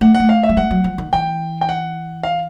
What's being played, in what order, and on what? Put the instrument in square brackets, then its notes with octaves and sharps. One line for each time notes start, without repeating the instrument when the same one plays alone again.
[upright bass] A3 [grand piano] F#5
[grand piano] F#5
[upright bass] A3
[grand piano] F5
E5
[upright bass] G3
[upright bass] G#3 [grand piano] F#5
[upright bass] F#3
F3
D#3
[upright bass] E3 [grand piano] G5
[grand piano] G5
F#5
F5